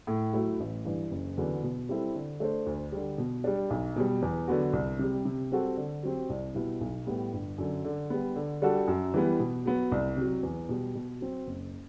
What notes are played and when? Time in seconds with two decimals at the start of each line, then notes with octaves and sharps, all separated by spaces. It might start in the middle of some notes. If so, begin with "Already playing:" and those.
0.07 A2
0.33 F#3 A3 E4
0.60 A1
0.85 G2 E3
1.11 F#1
1.37 E2 D3 F#3 B3
1.63 B2
1.89 G3 C4 E4 A4
2.15 D3
2.40 A3 D4 A4 C5
2.66 D2
2.92 D3 G3
3.18 B2
3.44 G3 D4
3.70 B1
3.96 B2 G3
4.22 E2
4.48 D3 F#3 B3 F#4
4.73 C2
4.99 C3 G3
5.25 C3
5.52 G3 C4 F#4 A4
5.77 D3
6.03 F#3 C4 G4
6.30 C2
6.55 B2 G3 B3 E4
6.81 B1
7.07 A2 G3 B3
7.33 G1
7.58 F#2 D3
7.85 D3
8.10 G3 B3
8.36 D3
8.62 G3 D4 F#4 A4
8.88 F#2
9.14 E3 G3 B3
9.40 B2
9.65 F#3 B3
9.92 C2
10.17 C3 F#3
10.43 E2
10.69 B2 G3
10.95 B2
11.21 F#3 C4
11.47 F#1